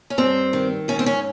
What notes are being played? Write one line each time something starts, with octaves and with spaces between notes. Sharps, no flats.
C#4
G2 C4
D#3
G#2 C#4
C4
C#4